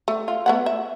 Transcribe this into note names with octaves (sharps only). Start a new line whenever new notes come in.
A3
F4
A3 B3 F#5
E5